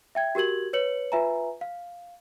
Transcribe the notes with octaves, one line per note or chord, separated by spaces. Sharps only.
E5 G5 G#6
F#4 G4 A#4 G#6 F#7
B4 C#5 C#7 F#7
F4 B4 E5 G#5 A#5
F5